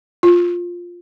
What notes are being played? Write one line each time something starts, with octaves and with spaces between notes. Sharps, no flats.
F4